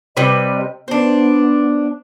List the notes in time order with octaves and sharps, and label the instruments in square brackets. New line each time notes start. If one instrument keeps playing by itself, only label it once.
[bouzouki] C3 G3 B4 [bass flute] D#5
[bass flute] B3 [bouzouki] D4 C5